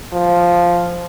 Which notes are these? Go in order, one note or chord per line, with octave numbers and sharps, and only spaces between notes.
F3